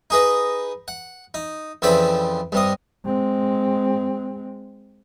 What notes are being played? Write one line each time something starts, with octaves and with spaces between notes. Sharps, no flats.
D#4 G#4 B4 D#5
F#5
D#4
F2 C#3 E3 C4 D5 B5
G2 C3 D#5
G#3 C4